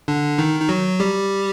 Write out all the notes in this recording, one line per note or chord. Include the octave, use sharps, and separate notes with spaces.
D3 D4
D#3 D#4
D#4
F#3 F#4
G3 G4